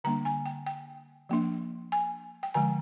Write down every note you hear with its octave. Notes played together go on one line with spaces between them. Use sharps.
D3 G3 A#3 D4 A#5
G#5
G5
G5
F3 A#3 D4
G#5
G5
D3 F3 G#3 G#5